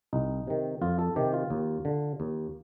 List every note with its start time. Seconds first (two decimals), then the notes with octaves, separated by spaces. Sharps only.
0.13 C2 D#4
0.47 C3 D#3
0.82 F2 F4
0.99 A4
1.16 C3 D#3 G4
1.34 F4
1.50 D#2
1.85 D3
2.20 D#2